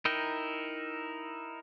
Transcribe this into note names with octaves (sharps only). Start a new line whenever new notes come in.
D#4 E4 A#4 G5